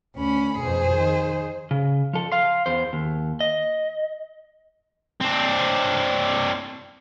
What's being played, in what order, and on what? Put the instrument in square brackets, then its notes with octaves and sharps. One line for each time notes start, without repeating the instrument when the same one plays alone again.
[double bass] D2 [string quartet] C#4 B5
[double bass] F2 B2 [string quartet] G#4 C5
[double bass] D#3
[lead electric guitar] C#3
F3 A4
F5 C6
E2 C5
D#2
D#5
[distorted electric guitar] C4 D4